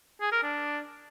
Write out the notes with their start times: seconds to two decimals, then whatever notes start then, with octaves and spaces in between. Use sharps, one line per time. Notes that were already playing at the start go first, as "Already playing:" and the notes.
0.21 G#4
0.32 A#4
0.43 D4